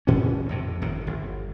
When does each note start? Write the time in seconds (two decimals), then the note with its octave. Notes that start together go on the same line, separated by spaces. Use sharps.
0.07 A1 D2 A#2 C#4
0.49 F2 A2 C3
0.82 G1 D#2 A#2
1.07 G1